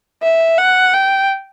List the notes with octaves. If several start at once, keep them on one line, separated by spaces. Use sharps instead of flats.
E5
F#5
G5